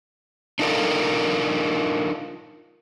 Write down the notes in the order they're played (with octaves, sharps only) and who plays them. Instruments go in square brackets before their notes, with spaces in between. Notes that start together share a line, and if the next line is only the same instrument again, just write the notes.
[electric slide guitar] D4 D#4 F4 A4 A#4 D5